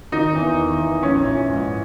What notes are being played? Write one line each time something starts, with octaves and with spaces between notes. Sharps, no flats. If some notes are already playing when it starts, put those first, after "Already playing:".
D#3 D#4
E2
D#3
E2
A#1 C#4
A#1
G#2